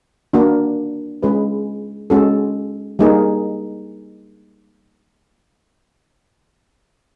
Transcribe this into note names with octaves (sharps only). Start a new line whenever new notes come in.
A#3 D4 F#4
G#3 C#4 F4 G#4 B4
G#3 C#4 F#4 A4
G3 A#3 D#4 G#4